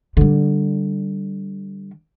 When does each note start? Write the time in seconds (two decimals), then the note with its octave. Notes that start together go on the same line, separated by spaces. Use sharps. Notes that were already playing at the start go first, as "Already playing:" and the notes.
0.17 D3 G3